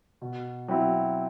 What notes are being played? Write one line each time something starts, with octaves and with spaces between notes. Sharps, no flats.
B2
F#3 C4 E4